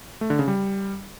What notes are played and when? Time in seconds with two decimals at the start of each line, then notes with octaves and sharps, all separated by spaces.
0.21 A3
0.30 D3
0.39 C#3
0.48 G3